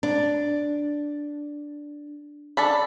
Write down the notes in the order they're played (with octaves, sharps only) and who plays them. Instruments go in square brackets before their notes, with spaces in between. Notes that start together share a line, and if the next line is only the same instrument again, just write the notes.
[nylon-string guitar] D4
[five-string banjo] D4 A4 B5